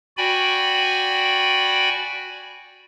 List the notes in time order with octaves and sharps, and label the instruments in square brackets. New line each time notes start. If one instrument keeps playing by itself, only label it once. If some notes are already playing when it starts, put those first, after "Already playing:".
[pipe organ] F#4 D5 G5 G#5 B5